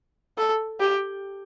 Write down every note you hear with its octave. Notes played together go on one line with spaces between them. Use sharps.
A4
G4